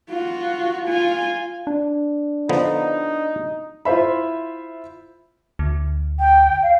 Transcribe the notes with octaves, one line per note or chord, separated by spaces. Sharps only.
F4 F#4
F4 G#5
D4
D3 F3 B3 D#4
E4 F4 C5 E5 B5
D2
G5
F5